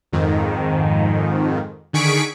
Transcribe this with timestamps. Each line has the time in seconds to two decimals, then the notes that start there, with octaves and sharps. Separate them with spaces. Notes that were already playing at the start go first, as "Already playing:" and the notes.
0.13 F2 G#2 D#3
1.93 D3 D#3 G#4 C#6 B6 D7